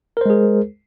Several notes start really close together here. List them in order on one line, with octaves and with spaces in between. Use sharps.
A#4 C5 G#3 G#4